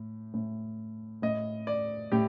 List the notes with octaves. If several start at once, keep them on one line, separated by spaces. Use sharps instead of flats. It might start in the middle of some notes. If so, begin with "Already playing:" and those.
Already playing: A2
A2
A2 D#5
D5
A2 G4